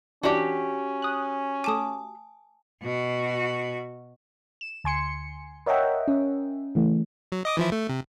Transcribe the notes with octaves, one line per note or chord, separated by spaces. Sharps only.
E3 C#4 D4 F#4 G4
D#6 F#6
A3 G#5 A5 D6 D#6
B2 F#4
E7
D2 G#5 C6 C#7
A#4 C#5 D#5 E5 F#5 G5
C#4
C#3 E3 A3
F#3
D#5 D6 D#6
E3 F3 E4
A3
C3